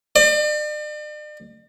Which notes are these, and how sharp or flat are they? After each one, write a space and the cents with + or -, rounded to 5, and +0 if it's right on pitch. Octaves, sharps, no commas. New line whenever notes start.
D5 +40